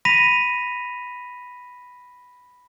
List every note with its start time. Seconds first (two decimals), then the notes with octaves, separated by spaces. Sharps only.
0.05 B5 A#6 B6 D#7 F7